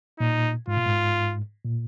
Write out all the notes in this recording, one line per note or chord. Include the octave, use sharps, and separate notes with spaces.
A#2 D#4
G#2 F4
A#2
G#2
A#2